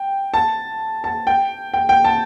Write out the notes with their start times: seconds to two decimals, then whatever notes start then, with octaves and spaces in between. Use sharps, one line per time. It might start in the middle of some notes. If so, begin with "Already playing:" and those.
Already playing: G5
0.34 A5
1.04 A5
1.27 G5
1.74 G5
1.89 G5
2.05 A5